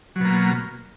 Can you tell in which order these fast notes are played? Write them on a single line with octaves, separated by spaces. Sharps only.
F#3 B2 A#3